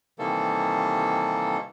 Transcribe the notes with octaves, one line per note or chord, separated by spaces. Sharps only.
C3 D#3 E3 G3 A#3 A4